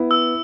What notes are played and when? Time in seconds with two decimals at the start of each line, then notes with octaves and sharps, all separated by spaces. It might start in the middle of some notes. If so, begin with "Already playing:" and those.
Already playing: B3 E4
0.11 E6